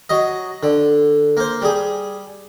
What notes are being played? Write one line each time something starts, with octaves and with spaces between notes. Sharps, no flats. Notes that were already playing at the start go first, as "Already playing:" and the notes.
F#3 D#5
D3
A#3 C5
G3 G#4